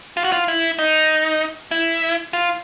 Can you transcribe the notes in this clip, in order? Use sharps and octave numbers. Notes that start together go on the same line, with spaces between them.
F4
F#4
F4
E4
D#4
E4
F4